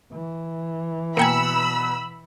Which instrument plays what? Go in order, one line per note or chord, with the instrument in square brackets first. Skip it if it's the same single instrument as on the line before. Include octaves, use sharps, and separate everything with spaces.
[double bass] E3
[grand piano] B2 A#5 C#7 [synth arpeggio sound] A#3 G5 G#5 [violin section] B5 E6